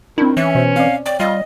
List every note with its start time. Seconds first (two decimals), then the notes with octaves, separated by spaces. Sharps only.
0.18 D#3 C4 D4 E4
0.37 E3 C#4 E5
0.55 B2 C5
0.76 C4 D5 F5
1.06 C#5 D5 G5
1.20 G3 F4 D#5